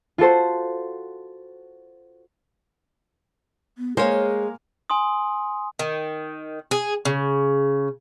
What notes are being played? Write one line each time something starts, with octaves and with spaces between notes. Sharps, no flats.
F4 F#4 A4 C5
B3
G#3 A#3 G#4 C5 C#5 F5 G#5
G#5 C6 D#6
D#3
G#4
C#3